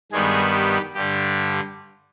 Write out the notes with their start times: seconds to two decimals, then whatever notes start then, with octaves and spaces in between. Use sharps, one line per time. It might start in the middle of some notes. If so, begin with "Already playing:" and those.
0.12 G2 D#3 G3 G#3 B3 G#4
0.53 G4
0.94 G2 D3 G3 G4